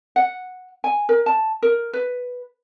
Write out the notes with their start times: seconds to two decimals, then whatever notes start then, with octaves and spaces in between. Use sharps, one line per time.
0.16 F#5
0.84 G#5
1.09 A#4
1.26 A5
1.62 A#4
1.93 B4